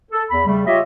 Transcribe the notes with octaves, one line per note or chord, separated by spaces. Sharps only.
A4
E2 B5
C#3 G3 A3
F4 G4 C#5 D#5 E5